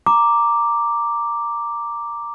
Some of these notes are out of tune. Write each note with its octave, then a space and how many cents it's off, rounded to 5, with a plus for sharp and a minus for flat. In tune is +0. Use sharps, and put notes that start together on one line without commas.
A#5 +0 D6 +0